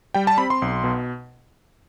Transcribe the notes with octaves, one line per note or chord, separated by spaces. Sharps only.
G3 G5
A5
C4 B5
C6
B1
B2